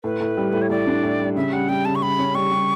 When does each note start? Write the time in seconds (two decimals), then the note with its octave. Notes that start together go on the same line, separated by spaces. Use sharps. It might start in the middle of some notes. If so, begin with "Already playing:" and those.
0.04 A2 B4
0.20 A2
0.37 G3
0.53 A2
0.62 C#5
0.70 A2 D5
0.87 D4
1.03 A2
1.20 G3
1.36 C#3 E5
1.53 G3 F#5
1.69 G3 G5
1.85 C#3 A5
1.95 C#6
2.02 G3 B5
2.19 C#4
2.35 G3 C#6
2.52 G3